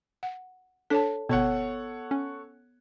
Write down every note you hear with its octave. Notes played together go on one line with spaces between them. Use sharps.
F#5
D4 A4 C#5 A5 B6
G1 B2 B3 A4 C#5 F#5
C#4